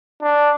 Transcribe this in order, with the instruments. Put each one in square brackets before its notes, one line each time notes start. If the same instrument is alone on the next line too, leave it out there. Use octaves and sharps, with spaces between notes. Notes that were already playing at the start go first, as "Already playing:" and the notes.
[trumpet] D4